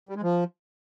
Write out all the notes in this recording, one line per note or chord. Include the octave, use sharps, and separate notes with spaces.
G3
G#3
F3